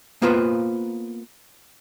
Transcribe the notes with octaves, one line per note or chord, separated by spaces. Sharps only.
A#3 B3 F4 B4 C5